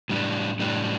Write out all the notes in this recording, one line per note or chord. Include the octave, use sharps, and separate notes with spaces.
A2 G3 D4
A2 G3 D4